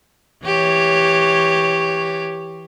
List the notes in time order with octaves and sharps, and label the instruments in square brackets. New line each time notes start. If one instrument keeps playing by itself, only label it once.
[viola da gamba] E3 G4 C#5